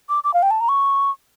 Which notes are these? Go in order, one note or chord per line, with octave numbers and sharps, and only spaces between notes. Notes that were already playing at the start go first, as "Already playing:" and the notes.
D6
D6
F5
G5
A5
A#5
C#6